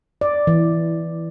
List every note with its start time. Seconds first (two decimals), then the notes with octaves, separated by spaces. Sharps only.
0.21 D5
0.47 E3